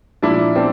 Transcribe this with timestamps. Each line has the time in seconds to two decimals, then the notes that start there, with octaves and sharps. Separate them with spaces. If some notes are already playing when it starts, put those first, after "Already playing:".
0.22 A#2 F3 D4 E4
0.56 C4 D4